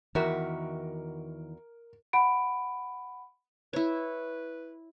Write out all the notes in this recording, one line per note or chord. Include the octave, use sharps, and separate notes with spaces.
E2 D#3 E3 F#4 A#4 E5
F#5 B5 D7
E4 B4 C#5